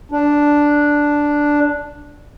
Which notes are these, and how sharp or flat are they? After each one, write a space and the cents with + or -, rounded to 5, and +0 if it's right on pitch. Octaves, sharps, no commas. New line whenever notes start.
D4 +0